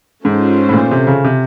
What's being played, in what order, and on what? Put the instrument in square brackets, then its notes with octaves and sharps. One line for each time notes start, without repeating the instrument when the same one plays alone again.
[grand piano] G#2 [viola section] C#4 F4 A4 C5
[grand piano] A2
A#2
C3
C#3
C3